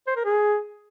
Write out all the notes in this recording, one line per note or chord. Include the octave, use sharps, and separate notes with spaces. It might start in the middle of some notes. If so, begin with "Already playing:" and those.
C5
A#4
G#4